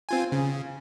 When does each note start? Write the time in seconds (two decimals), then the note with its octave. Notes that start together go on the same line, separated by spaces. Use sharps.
0.09 C4 F4 G#5
0.32 C#3